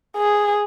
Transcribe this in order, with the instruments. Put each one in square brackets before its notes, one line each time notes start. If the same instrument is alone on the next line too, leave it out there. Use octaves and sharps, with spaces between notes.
[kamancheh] G#4